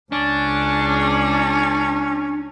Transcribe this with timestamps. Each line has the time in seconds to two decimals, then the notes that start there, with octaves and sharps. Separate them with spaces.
0.12 C#2 C#4 D4